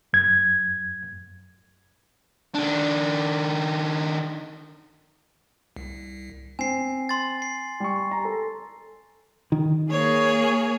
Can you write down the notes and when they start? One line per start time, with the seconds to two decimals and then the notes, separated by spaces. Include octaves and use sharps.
0.13 F#2 G#6
2.55 D#3 D4
5.76 C2
6.59 C4 G#5 C7
7.09 C6 A6
7.42 C7
7.80 G3 C#6
8.11 A#5
8.25 A4
9.52 D#3
9.89 A#3 G#4 C#5